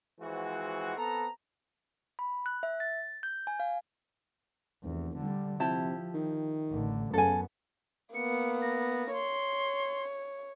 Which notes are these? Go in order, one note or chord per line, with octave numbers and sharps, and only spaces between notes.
E3 F3 G#3 C4 F#4
B3 C4 A4 A#5
B5
F#6
E5
A6
G6
G#5
F5
F1 E2
D3 G3
C3 F3 E4 G4 A5
D#3
A1 D3
F#2 C#3 B3 A4 G#5
A#3 B3 C#7
A#6
C#5 C6